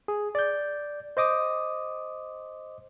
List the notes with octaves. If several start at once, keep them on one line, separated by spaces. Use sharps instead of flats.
G#4
D5 G6
C5 D#5 D6 D#6